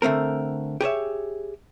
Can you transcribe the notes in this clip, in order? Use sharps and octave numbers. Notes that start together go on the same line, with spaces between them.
D3 A3 C4 A#4
G4 G#4 C#5 E5